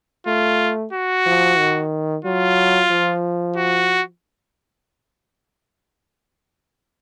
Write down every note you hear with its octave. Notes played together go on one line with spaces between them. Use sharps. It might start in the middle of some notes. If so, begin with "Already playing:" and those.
A3 F4
F#4
F3
D#3
F#3 F4
F3
F#4